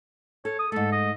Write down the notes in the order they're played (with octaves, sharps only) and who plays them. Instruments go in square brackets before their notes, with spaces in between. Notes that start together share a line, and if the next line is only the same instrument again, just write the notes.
[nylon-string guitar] A4 [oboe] C#5
[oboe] D#6
[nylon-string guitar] G#2 A3 [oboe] A4
[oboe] D#5